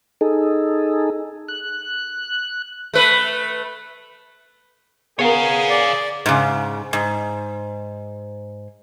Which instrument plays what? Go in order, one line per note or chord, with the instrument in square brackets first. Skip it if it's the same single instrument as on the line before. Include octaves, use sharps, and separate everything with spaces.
[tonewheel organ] D#4 G#4 A4
F#6
[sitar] A3 B4
[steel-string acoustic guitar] B3 A#4 [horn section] G#4 [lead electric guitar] C#5 F5
[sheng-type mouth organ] D5
[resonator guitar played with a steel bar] G#2 C#3
G#2